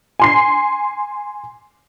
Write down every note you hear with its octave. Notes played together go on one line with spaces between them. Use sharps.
G#5 C6 C7